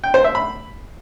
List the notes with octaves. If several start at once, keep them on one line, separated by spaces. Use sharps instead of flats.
G5
C5
E5
B5